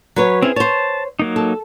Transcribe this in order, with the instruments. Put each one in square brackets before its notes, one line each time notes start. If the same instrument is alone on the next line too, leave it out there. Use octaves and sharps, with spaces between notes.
[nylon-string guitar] F#3 B4 C#5
[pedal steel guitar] C4 C#4 E4 [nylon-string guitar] G#4
[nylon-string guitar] C5 C#5 [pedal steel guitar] A5
[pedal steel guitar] F#3 A#3 D#4
[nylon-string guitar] A4